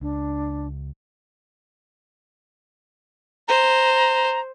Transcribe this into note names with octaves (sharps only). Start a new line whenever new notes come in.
C#2 D4
C5 A#5